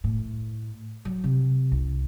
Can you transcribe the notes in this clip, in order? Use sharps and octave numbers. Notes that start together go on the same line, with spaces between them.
A2
F#3
C3
C2